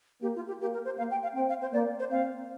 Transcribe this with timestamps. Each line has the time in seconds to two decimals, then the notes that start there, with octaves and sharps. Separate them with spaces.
0.22 A#3 G4
0.35 F4
0.47 G4
0.60 A#3 G4
0.73 A#4
0.85 C5
0.98 A#3 F5
1.11 G5
1.23 F5
1.35 C4 G5
1.48 F5
1.61 C5
1.73 A#3 D5
1.99 C5
2.11 C4 F5